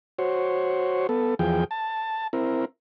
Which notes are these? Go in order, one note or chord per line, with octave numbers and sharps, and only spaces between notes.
F#4 C5 C#5
B3 A4
E2 F3 G#4 G5
A5
C4 E4 A#4